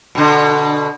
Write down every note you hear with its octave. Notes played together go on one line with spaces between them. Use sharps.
B2 D3